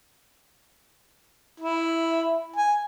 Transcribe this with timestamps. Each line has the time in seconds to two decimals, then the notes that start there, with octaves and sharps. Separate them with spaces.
1.60 E4
2.56 G#5